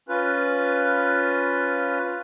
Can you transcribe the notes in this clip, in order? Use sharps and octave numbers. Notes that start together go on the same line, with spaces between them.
C#4 F4 B4